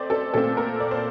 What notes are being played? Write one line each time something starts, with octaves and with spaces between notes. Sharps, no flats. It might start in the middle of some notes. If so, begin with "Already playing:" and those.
Already playing: A3 C4 C5 D5 D#5
A4
A#2 A3 C4 A4
A#4
D5
C5